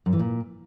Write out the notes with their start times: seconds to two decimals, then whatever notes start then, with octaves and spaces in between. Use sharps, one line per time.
0.06 F#2
0.13 E3
0.19 A#2